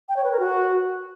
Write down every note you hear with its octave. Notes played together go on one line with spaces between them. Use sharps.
G5
C#5
B4
A#4
F#4